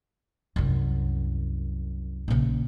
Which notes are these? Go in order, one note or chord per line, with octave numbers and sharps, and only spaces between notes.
C2 F#2
A#1 C#3